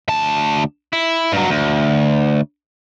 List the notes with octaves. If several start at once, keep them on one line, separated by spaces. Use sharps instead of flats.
D2 A5
E4
G2 F#3
D2